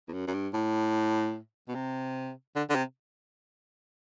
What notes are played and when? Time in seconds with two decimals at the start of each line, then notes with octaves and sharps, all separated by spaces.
0.08 E2
0.13 F#2
0.27 F#2
0.34 G2
0.53 A2
1.68 B2
1.75 C3
2.56 D3
2.69 D3
2.75 C3